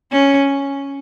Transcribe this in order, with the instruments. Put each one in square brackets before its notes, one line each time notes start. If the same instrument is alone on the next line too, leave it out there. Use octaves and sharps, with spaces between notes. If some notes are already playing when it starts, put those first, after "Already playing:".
[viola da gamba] C#4